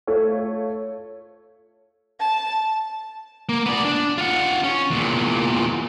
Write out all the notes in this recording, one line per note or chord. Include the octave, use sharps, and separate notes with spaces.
A3 F4 A4 C#5
A5
A#3
B3 D5
D4
F4 F#5
C#4
E2 A#2